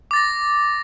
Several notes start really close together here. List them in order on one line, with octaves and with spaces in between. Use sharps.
D6 A6 A#6